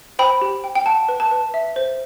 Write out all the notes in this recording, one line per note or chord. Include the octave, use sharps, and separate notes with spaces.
C5 G5 B5
G4
G5
G5
F#5 A5
B4
A5
B4
E5
C5